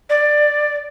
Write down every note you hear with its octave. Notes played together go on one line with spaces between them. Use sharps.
D5